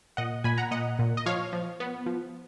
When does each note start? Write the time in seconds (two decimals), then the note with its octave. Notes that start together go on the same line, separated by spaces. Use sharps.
0.17 A#2 D#5 F#5
0.44 A#2 G#5 B5
0.58 F#5 A#5
0.71 A#2 D#5 F#5
0.99 A#2
1.17 D#5
1.26 F3 C#5 F5
1.53 F3
1.80 B3
2.06 F3